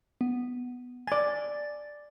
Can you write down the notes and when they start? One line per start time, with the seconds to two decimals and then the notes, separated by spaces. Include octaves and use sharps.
0.21 B3
1.07 D5 G#5 A6